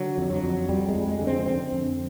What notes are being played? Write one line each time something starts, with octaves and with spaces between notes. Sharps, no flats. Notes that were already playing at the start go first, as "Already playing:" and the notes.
Already playing: D3 F#3
F2
F#3
F2
F2 G3
G#3
F2
G#3
D3
C4
D3 C4
F2